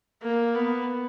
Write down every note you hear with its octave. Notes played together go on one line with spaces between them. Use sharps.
A#3
B3